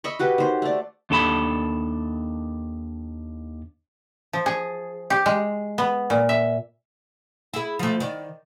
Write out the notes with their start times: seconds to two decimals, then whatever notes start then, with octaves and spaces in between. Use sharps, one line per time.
0.04 D#5 E5 B5 C#6
0.19 F#4 G4 B4
0.38 D#3 C5
0.62 A3 D5
1.10 D#2 D4 A4 A5 B5
4.33 F3
4.46 G#4
5.10 G4
5.26 G#3
5.78 B3
6.10 A#2
6.29 E5
7.54 E4 G#4
7.79 F3 A3
8.00 D#3 D5